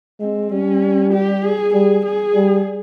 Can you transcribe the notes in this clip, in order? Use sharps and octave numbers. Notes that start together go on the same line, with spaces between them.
G#3 C4
G3 C#4
G4
G#4
G3 G#4
G#4
G3